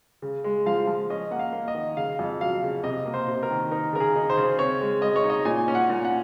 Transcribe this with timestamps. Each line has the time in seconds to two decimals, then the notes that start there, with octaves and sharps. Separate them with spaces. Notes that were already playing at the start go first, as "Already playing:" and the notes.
0.22 C#3
0.44 G#3
0.66 F3 F5
0.87 F3
1.10 C#4 D#5
1.31 A#3 F#5
1.39 F5
1.53 A#3
1.68 D#5
1.75 D#3
1.97 C#3 F5
2.19 F2
2.41 F#3 F5
2.63 C#3
2.84 C3 D#5
3.05 A#3
3.14 C5
3.28 C3
3.43 A#4
3.50 D#3
3.71 D#4 A#4
3.93 C#3 A#4
4.00 G#4
4.16 D#4
4.30 C5
4.37 C#3
4.59 C4 C#5
4.81 G#3
5.02 G#3 D#5
5.16 C#5
5.24 D#4
5.30 D#5
5.45 A#2 G#5
5.68 C#4
5.75 F#5
5.90 A#2
6.05 F#5